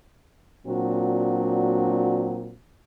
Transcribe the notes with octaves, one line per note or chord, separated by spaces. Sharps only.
A#2 F#3 C4 D4 F#4